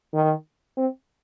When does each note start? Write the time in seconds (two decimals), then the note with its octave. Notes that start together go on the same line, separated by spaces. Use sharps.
0.14 D#3
0.77 C4